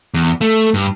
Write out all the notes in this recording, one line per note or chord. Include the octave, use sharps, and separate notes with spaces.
E2
A3
G2